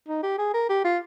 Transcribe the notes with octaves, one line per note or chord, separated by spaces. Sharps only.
D#4
G4
G#4
A#4
G4
F4